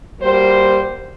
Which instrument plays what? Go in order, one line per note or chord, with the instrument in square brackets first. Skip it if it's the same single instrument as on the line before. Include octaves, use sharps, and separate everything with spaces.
[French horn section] G3 A#3 F#4 C5